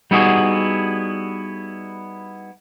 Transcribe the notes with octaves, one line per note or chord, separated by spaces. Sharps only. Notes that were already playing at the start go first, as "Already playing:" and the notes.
G3 B3 D#4 E4 F#4 G#4